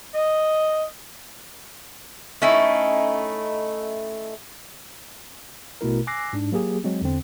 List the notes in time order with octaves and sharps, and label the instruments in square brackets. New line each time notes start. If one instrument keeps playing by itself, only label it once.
[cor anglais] D#5
[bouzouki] A3 C#4 D#4 E4
[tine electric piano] A1 B2 A3 E4 A#4
G#5 D6 E6 F#6 A#6 C7
G#2 D4
F#3 A#3 G4 G#4
F#3 G#3 C4
E2 D3 C4